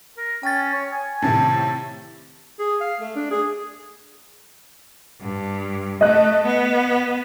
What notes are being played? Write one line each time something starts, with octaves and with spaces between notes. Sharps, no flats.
A#4
C#4 G5 A6
C#5
G#5
A2 C3 D#3 A5
G#4
F5
A3
D4
G#4
G2
A3 D#5 F#6
B3